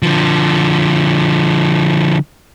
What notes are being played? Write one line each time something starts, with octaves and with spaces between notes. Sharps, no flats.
D3 F3